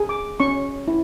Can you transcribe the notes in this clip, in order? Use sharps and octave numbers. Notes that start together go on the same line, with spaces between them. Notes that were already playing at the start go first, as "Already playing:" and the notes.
Already playing: G#4
D6
C#4 C#6
E4